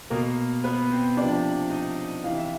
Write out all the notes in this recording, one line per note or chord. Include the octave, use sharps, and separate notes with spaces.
B2 A#3 A#4
B3 B4
C4 C5
C3 F3 D4 D5
D#4 D#5
C3 E3 F5
E5